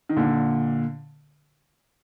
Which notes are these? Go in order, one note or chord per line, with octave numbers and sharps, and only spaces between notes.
D#3
A#2 D3